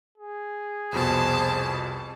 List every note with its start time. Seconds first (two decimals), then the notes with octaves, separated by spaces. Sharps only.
0.18 G#4
0.92 C2 F2 B2 C5 A5